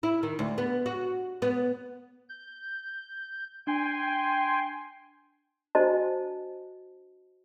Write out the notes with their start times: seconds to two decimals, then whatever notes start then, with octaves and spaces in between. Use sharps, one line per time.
0.03 E4
0.23 D#3
0.39 D2
0.58 B3
0.86 F#4
1.42 B3
2.29 G6
3.67 D4 G5 G#5 C6
5.75 D4 F#4 C5 D#5 A5